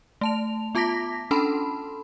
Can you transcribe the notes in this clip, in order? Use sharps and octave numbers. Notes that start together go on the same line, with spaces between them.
A3 A5 F7
B3 F4 A5 D6 A#6 B6
C#4 D4 A4 A5 B5 C6